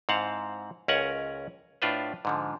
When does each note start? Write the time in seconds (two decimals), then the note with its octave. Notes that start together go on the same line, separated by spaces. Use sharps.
0.09 G#2 C4 E4 F5 F#5 A5
0.88 C#2 C#4 A#4 F#5 G#5
1.82 A2 D4 F4 B4 C5
2.25 G#2 D3 F3